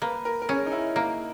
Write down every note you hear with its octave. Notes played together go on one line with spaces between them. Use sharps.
A#3 B4
A#4
A#4
C#4 G#4
D#4
E4
A#3